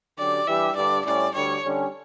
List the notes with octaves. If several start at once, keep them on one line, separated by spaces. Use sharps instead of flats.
D3 F#3 C#4 G4 D5
E3 G3 D4 G4 E5
G2 D3 G3 D4 G4 D5
A2 G3 C#4 D5
D2 D3 G3 C#5
D3 G3 C#4